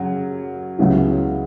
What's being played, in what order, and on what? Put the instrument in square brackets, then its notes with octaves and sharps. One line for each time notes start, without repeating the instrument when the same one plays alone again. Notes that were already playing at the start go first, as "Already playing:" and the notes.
Already playing: [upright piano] F#2 C#3 F#3
C#2 C#3 F#3 B3 E4